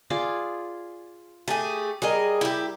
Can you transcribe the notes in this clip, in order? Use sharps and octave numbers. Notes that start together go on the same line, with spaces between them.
F4 G#4 D5
A3 G4 G#4
G3 G#4 A#4 D#5
E4 G4